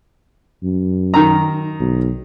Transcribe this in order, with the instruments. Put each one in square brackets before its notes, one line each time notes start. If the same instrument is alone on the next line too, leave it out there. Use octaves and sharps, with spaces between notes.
[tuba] F#2
[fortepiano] D#3 A#5
[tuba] B1